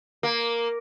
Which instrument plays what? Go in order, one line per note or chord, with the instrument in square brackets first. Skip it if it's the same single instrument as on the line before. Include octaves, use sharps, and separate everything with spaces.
[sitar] A#3